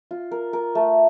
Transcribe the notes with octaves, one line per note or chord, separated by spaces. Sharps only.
F4
A#4
A#4
A3